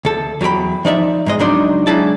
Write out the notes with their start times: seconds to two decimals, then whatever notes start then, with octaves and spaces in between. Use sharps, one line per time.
0.05 D2 A4
0.41 E2 F#3 F4 G5 B5
0.85 F3 D#4 D5 E5
1.26 G#2 G#3 D#5
1.40 C#2 F#3 D4 D#4 D5 C6
1.87 F#3 G#3 D4 E4 A5